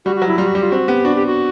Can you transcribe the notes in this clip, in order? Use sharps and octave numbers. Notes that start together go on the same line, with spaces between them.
G3 F#4
F#4
F#3
E4
G3 F4
F#4
G3 G4
F4
C4 F#4
B3 G4
D4 F#4
G4
F#4